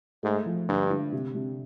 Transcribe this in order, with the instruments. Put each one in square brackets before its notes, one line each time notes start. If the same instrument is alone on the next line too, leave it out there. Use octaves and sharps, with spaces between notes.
[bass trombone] G#2 [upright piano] A3
[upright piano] F3
[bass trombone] G2 [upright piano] D3
[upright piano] D3
C3
C3